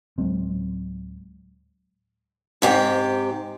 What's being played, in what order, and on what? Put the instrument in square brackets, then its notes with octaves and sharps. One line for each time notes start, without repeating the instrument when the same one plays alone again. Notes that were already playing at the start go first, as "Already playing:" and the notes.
[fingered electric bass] D1 F#3 G#3 C4
[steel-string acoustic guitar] G#2 C3 G4